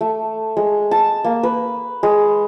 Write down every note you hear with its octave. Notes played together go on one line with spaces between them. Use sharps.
A3
G#3
A5
A#3
B4
G#3